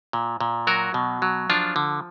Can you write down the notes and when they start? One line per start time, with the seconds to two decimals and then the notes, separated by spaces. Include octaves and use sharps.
0.13 A#2
0.41 A#2
0.67 F#3 F#4 A#4
0.94 B2
1.22 F#3
1.50 F3 D4 F4
1.76 D3